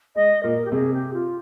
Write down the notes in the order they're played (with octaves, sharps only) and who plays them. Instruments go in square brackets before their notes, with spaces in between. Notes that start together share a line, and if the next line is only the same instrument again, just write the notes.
[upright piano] G#3 [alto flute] D#5
[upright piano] A#2 A#3 [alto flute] A#4
[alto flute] G4
[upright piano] C3 C4 [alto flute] G#4
[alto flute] G4
F4